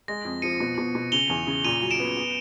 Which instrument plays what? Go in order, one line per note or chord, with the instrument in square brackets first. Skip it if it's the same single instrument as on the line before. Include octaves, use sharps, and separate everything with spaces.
[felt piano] G#3 [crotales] A#6
[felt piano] F2
[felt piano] F3 [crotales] C#7 D#7
[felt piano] B2
B2
B2
[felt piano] C#3 [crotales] F7 G7
[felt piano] E2
C#3
[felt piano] A#2 [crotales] D#7 F7
[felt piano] F#3
[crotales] D7 E7
[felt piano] B3
B3